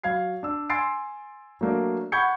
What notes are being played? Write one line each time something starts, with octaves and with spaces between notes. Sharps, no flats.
F#3 F5 G#6 C7
D4 E6
G#5 C6 E6 A6 C7 D7
F#3 A3 A#3 D4
F#5 B5 C#6 G6 G#6 C#7